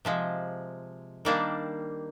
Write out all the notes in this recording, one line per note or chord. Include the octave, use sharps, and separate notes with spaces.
C3 F3 G#3
D#3 G3 A#3 D4